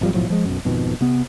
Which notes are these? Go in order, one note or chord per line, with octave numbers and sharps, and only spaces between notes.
G#1 F3 G3
B1 A2 F3 F#3
F3 G#3
B1 F#2
G#1 F2 B2 D#3
C3 B3